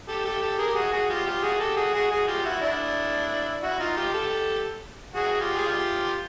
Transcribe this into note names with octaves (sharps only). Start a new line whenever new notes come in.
G4 A4
G4 A4
G4 A4
G#4 A#4
G4
F#4 G#4
F#4 G#4
F4 G4
F4 G4
F#4 G#4
G4 A4
F#4 G#4
F#4 G#4
F#4 G#4
F4 G4
E4 F#4
D4 E4
E4 F#4
D#4 F4
F4 G4
G4 A4
F#4 G#4
F4 G4
G#4
F4 G4